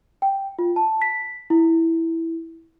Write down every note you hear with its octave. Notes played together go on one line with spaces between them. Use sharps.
G5
F4
A5
B6
E4